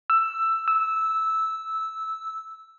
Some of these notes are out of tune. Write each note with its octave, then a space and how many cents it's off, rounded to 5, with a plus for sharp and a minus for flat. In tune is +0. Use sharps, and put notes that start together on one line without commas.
E6 +10
E6 -10